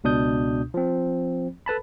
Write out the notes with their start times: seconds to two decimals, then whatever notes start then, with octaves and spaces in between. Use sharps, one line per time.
0.04 C#2 B2 D4 D#6 G6
0.74 F3 C4
1.66 A4 B4 A5 B5